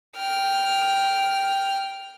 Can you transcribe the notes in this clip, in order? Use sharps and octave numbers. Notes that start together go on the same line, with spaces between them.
G5 F6